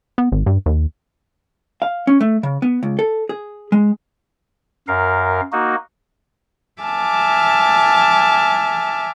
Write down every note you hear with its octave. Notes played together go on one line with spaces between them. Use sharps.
B3
G#1
G2
D#2
F5
C#4
A3
C#3
B3
C#2
A4
G#4
G#3
F#2 A#4 F5
A#3 D#4 F#4
E5 G#5 A5 D6 F6